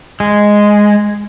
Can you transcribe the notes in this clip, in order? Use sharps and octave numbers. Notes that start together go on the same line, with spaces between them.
G#3